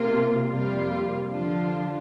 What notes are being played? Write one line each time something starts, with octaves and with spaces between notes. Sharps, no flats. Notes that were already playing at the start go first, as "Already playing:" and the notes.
Already playing: C3 A#3 F4
F2 C3 G3 A#3 F4
D3 F3 D4 F4